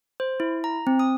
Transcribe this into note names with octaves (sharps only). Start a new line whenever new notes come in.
C5
E4
A#5
C4
D#6